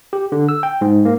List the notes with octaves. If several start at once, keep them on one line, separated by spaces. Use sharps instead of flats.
G4
D3
E6
G5
G#2
A#3